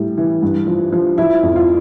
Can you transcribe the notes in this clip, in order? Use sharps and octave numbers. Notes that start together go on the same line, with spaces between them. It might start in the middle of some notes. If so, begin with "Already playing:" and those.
Already playing: A2 G3
E3
G2
F3
F3
F3 E4
F2
F4